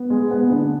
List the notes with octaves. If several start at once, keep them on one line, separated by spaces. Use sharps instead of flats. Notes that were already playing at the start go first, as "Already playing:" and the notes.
Already playing: B3
G#3
B3
D3